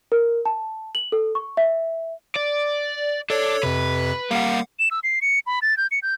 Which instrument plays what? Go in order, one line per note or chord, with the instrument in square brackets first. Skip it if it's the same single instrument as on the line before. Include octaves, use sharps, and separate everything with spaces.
[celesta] A#4
A5
F#7
A4
C#6
E5
[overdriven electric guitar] D5
[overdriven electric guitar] D4 [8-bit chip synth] A4 C#5
[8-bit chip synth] F2 C3 [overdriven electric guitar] B4
[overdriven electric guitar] G3 A#3 [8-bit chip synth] F5 F#5
[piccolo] E7
E6
C7
C#7
B5
A6
G6
C#7
G6